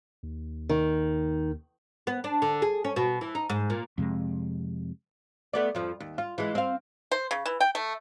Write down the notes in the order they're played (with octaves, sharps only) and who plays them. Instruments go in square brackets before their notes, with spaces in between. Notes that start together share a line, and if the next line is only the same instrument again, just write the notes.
[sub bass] D#2
[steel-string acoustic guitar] D#3
[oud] B3
D4
D3
G#4
C#4
B2
E3
D#4
G#2
A#2
[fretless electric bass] F2 C3 G#3
[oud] A3 B3 D5
F2 F3
D#2
F4
E3 G#3
C4 F5
[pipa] C5
C#3
E3
G5
A3